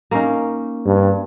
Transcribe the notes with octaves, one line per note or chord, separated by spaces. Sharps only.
A#3 C#4 D#4
G2